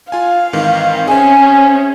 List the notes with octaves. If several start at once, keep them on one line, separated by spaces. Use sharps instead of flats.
F4 F5 G#5
G#2 D#3 E3 C4
C#4 G#4 C5 E5 G#5